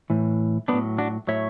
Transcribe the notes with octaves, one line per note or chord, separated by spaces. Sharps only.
A2 E3
A2 F#3 B3 D4
D4 F#4
A2 F#3 C#5 E5